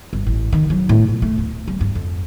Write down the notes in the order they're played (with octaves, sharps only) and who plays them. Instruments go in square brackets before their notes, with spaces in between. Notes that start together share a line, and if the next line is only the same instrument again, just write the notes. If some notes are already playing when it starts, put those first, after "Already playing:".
[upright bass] G1
A1
D#3
F#3
A2
A#2
A3
D1
G3
G2
F2